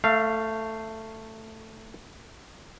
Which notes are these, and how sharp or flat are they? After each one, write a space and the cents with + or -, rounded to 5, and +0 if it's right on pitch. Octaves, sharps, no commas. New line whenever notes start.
A3 +10 F5 -15